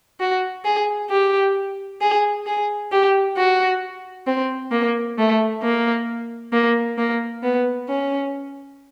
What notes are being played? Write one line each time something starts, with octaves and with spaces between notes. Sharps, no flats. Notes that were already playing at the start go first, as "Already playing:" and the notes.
F#4
G#4
G4
G#4
G#4
G4
F#4
C4
A#3
A3
A#3
A#3
A#3
B3
C#4